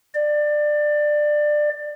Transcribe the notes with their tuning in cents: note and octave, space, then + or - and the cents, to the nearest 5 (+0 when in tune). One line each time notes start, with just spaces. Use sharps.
D5 +20